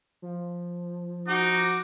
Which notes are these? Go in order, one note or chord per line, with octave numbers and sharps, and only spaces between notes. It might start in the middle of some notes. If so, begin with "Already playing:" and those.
F3
D#4 F#4 D6